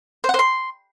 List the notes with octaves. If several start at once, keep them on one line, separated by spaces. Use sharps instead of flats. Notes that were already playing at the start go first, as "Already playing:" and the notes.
C5
F#5
C5
C6